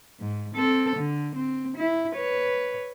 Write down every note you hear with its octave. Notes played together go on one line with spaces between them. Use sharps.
G#2
C4 A4
D3
C4
E4
B4 C#5